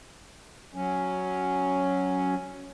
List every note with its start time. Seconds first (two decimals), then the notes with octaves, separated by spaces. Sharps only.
0.74 F#3 C#4